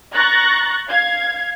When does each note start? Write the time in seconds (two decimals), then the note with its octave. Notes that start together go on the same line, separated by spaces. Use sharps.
0.15 A#5 C#6 F#6 A6 A#6
0.89 F5 G#6